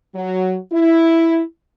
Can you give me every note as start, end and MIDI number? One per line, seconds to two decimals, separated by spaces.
0.14 0.55 54
0.71 1.40 64